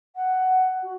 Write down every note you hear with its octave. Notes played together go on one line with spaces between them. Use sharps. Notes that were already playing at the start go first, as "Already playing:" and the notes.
F#5
F#4